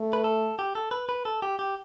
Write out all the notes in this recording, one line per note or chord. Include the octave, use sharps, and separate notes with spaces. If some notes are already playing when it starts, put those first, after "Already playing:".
Already playing: A3
B4
A4
G4
A4
B4
B4
A4
G4
G4